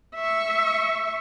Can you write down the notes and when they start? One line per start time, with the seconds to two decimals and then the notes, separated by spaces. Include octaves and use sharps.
0.15 E5 C#6